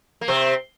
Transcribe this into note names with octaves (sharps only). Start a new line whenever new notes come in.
A#3
C3 C4